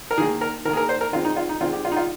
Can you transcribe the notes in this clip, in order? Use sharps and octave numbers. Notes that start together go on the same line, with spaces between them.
A#4
D#3 A#3 G#4
A#4
D#3 A#3 G#4 A#4
A#4
C5
A#4
D#3 G#3 C4 F4
D#4
F4
D#4
D#3 G#3 C4 F4
G4
F4
D#4
F4